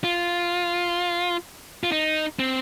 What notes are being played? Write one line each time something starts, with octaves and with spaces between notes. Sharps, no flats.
F4
F4
D#4
C4